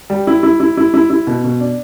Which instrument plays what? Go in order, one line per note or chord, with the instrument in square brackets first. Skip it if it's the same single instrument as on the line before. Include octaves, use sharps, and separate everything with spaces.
[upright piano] G3
E4
E4
E4
E4
E4
E4
B2
B2
D4